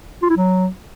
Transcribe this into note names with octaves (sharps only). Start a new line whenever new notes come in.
F4
E4
F#3